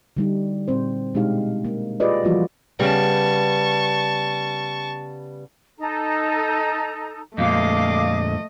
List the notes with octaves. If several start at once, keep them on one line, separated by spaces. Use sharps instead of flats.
D3 G3 D#4
A#2 C4 C5
B2 G#3 D4 D#4 G4 F5
A#3
F4 G4 G#4 B4 D5 D#5
E3 F3 G3 A#3 F4 F#4
C#3 G3 B3 A5 C#6
D#4 A4 A#5
F2 A#2 A3 D#5 F5 D6